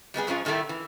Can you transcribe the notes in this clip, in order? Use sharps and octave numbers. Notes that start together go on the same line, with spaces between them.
G3 G#3 B3 G#4
G#2 F3 G#3 C#4 F4
A2 D#3 G3 A3 E4
E3